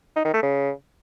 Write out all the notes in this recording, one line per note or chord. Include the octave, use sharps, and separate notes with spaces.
D#4
D#3
A3
C#3